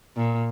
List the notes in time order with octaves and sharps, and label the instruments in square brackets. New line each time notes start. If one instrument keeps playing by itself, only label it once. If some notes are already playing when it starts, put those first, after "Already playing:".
[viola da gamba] A#2